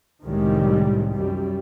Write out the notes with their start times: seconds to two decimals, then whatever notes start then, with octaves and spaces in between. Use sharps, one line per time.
0.22 C2 A2 D#3 F3 G3 G#3
1.12 F#2 G3